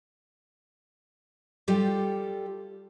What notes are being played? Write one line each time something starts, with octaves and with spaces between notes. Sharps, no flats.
G3 F4 G4 A4